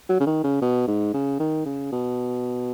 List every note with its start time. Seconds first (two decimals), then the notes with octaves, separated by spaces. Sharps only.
0.09 F#3
0.20 C#3
0.27 D#3
0.44 C#3
0.62 B2
0.88 G#2
1.14 C#3
1.40 D#3
1.66 C#3
1.92 B2